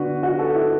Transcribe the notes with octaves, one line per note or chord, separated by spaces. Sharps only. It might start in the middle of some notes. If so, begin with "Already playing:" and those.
Already playing: D3 B3 D4 F#4 B4
F#4
A4
E4